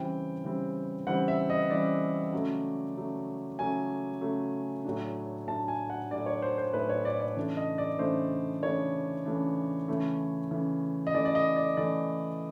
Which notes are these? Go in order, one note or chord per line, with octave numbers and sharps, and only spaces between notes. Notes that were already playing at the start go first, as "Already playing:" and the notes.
Already playing: C#3 E3 G3 C4 G5
C#3 E3 G3 C4
C#3 E3 G3 C4 F#5
E5
D#5
C#3 E3 G3 C4 D5
C#3 F#3 A3
C#3 F#3 A3
C#3 F#3 A3 G#5
C#3 F#3 A3
A2 F#3 A3 D4
A2 F#3 A3 D4 A5
G#5
F#5
A2 F#3 A3 D4 D5
C#5
C5
C5
A2 F#3 A3 D4 B4
C#5
D5
D5
C#3 E3 A3 D4
D#5
D5
C#3 E3 A3 D4 C5
C#3 E3 A3 D4 C#5
C#3 E3 A3 D4
C#3 E3 A3
C#3 E3 A3
D#5
C#3 E3 A3 D5
D5
D#5
D5
C#3 E3 A3 D5